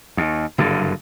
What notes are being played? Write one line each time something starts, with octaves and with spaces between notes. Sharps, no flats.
D#2
F#1 G2 D3